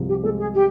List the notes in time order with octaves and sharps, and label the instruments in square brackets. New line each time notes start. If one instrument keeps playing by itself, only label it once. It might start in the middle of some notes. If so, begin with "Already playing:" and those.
Already playing: [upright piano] C2 F3 G#3
[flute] G4
[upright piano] G#3 [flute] A4
[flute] G#4
G4